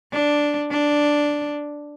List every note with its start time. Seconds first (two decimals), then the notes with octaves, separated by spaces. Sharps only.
0.13 D4
0.71 D4